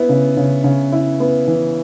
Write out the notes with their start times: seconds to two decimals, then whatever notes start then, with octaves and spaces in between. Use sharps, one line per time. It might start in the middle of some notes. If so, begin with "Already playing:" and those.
Already playing: B3 E4
0.09 C#3
0.37 C#3
0.64 C#3
0.92 E4
1.20 B3
1.48 E3